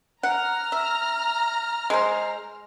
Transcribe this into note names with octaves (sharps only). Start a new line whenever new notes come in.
F#5 A#5 F6
E5
G#3 C5